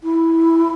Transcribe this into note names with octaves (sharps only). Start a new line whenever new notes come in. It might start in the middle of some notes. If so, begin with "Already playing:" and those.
E4